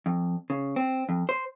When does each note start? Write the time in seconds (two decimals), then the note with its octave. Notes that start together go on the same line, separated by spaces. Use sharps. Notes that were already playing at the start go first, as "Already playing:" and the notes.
0.06 F2
0.50 C#3
0.76 C4
1.09 F2
1.29 C5